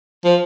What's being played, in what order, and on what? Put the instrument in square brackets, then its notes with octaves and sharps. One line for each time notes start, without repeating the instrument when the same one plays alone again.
[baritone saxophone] F3